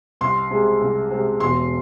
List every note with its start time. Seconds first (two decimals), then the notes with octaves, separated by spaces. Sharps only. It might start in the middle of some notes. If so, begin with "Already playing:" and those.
0.21 C2 C6
0.51 C3 G#3
0.81 C2
1.11 C3 G#3
1.40 E1 C6